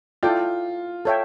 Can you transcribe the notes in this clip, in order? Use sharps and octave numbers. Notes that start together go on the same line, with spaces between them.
E4 F4 A4 D5 G5
A4 C#5 E5 G5